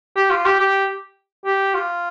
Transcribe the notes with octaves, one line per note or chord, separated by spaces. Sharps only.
G4
F4
G4
G4
G4
F4